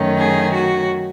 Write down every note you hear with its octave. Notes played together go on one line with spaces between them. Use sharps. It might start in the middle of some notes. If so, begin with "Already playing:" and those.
Already playing: F#2 D#3 A3 C#4
G#4
F#4